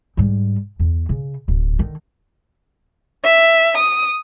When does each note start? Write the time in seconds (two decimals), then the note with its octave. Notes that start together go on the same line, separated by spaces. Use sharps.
0.17 G#2 G3
0.79 E2
1.09 C#3
1.48 D1
1.79 D3 D#3
3.23 E5
3.76 D#6